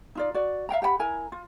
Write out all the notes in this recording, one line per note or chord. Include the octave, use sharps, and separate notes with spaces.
D#4 F4 D5
F#4 D5
E5 F5 G5 A#5
G4 F#5 G5 B5
E4 A#4 G#5 A#5
F4